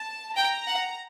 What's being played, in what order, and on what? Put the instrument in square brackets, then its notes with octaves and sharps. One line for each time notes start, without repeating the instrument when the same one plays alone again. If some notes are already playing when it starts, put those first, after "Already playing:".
Already playing: [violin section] A5
[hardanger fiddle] G5 [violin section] A#5
[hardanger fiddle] F#5